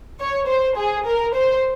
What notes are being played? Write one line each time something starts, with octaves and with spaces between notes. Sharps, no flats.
C#5
C5
G#4
A#4
C5